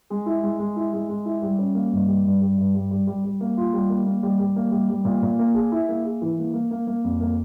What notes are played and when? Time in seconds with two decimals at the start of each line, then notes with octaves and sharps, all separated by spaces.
0.10 G#3
0.26 E4
0.43 G#3
0.59 G#3
0.76 E4
0.93 G#3
1.09 G#3
1.25 E4
1.42 G3
1.59 C#4
1.74 A#3
1.92 G2
2.08 G3
2.25 G2
2.41 G3
2.58 G2
2.74 G3
2.91 G3
3.07 G3
3.24 G3
3.41 A#3
3.57 F4
3.73 G3
3.89 A#3
4.06 A#3
4.23 G3
4.40 G3
4.56 A#3
4.72 G3
4.90 G3
5.05 A#2
5.23 A#2
5.39 A#3
5.54 G#4
5.72 E4
5.89 A#3
6.04 G#4
6.22 E3
6.38 A#3
6.53 A#3
6.71 A#3
6.87 A#3
7.04 F2
7.21 A#3